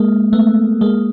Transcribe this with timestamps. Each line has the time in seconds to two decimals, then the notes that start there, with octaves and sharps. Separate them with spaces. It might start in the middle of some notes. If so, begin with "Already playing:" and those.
Already playing: G#3 A#3
0.33 A3 B3
0.81 G#3 A#3